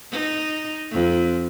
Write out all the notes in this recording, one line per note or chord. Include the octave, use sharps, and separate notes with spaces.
D#4
F2